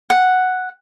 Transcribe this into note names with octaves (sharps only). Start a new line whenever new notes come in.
F#5